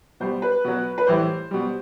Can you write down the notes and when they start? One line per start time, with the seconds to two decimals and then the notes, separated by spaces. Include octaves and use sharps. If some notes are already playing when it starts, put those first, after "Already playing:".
0.20 B2 G3 C5
0.42 B4
0.64 B2 F#3
0.98 B4
1.07 A2 E3 G3 C5
1.51 B2 G3